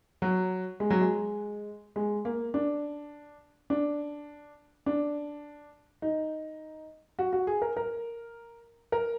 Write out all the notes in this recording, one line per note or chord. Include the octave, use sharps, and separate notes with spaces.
F#3
G#3
F#3
G#3
G#3
A#3
D4
D4
D4
D#4
F#4
F#4
G#4
A#4
A#4
A#4